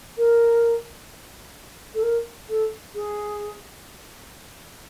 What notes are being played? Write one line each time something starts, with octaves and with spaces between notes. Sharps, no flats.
A#4
A4
A#4
A4
G#4